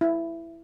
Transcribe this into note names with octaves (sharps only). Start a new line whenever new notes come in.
E4